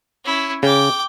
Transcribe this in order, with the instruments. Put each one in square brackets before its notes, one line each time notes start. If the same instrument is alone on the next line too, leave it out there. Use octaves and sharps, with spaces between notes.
[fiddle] C#4 E4
[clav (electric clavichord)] C#3 [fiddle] G5 D6